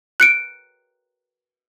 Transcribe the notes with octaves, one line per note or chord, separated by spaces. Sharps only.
F#6 C#7 D7